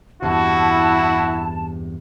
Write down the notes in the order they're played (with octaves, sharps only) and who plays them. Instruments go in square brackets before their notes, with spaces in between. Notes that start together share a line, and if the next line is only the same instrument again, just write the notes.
[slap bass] E2 G2 C3 [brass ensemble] E4 [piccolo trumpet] F#4 [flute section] A5